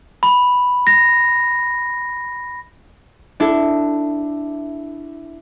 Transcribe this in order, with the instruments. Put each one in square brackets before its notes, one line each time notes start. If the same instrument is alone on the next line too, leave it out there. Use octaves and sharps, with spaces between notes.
[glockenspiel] B5
A#6
[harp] D4 E4 A4